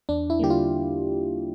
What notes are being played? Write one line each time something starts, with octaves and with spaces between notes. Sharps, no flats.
E2 D4
E4
D3 G3 A#3 G4
F4